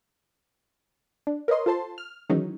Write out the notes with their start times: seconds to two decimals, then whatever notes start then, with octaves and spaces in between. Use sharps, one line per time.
1.27 D4
1.48 A#4 B4 C#5 D#5 C6
1.66 F4 A4 C5 A5 C6
1.98 F6
2.29 D#3 E3 F#3 G#3 C#4 D#4